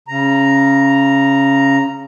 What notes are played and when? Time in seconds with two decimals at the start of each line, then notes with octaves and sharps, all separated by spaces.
0.08 C#3 A#5